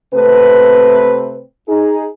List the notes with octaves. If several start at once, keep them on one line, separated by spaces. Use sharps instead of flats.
C3 A3 C4 B4
D#4 G#4